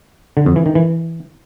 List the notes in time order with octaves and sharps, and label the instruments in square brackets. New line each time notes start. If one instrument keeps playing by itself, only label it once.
[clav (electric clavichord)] D3
F2
E3
D#3
E3